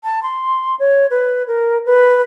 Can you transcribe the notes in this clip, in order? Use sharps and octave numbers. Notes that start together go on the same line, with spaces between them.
A5
C6
C#5
B4
A#4
B4